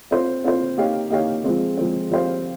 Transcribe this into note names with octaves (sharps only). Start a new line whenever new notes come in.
C4 F4 C5
C4 F4 C5
A#3 D#4 G4 C#5 F5
A#3 D#4 G4 C#5 F5
F3 G#3 C4
F3 G#3 C4
F3 C4 G4 C5 F5